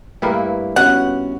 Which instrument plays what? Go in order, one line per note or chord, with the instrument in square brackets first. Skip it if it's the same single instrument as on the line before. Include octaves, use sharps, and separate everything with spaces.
[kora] G2 A#3 E4 [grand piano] A3 B4 G5
[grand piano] B3 C#4 F#4 [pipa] F#5